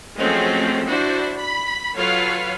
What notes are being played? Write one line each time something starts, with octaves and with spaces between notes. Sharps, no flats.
F3 F#3 G#3 A3 C4 C#4
D4 E4 F#4 C5
B5
F#3 F4 A4 B4 C#5 F5